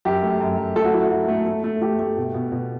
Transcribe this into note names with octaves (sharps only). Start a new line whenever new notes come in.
F#2 G4
A3
F#2
F#2
A3 A4
F#4
F#3 E4
F#3 F#4
A3
A3
A3
A3 G4
A3
B2
B2
B2